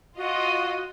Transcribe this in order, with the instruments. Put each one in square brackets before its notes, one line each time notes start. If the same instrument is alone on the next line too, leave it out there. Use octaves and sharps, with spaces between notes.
[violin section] F4 D#5 [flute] F#4